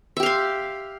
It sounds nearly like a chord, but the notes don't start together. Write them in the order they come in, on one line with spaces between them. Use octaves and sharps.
E5 G4 F5 C6